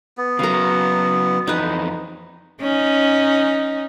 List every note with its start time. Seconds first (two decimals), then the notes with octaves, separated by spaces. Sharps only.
0.18 B3
0.39 C#3 F#3 A#4 F5
1.47 F2 E3 D#4 B4
2.61 C#4 D#4